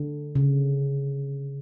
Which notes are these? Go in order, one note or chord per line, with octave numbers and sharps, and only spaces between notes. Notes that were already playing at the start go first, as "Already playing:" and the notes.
Already playing: D3
C#3